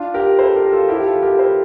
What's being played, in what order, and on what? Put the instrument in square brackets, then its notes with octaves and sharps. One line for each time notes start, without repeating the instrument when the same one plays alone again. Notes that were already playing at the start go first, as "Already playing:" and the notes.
Already playing: [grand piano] D4 F4
G4 A#4
A4 C5
G4 A#4
A#4
F4 A4
E4 G4
F4 A4
G4 A#4
A4 C5